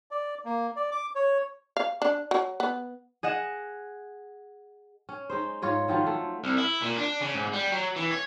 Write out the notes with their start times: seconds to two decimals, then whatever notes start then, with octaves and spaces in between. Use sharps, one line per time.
0.11 D5
0.45 A#3
0.76 D5
0.92 D6
1.15 C#5
1.77 F5
2.02 D4
2.31 F#3
2.60 B3
3.23 G#4 D#5 F#5 E7
5.09 C#4
5.30 G#3 D#4 C5
5.62 G#2 F4 C#5 D#5
5.88 D#3 F3 F#3 F4
6.06 A3
6.44 C2
6.58 E4
6.82 A#2
6.97 D4
7.21 C#3
7.34 G#2
7.53 G3
7.72 F#3
7.96 E3
8.11 C#5